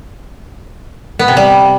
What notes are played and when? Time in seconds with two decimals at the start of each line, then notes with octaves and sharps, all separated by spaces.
1.19 B3
1.28 C3
1.37 G3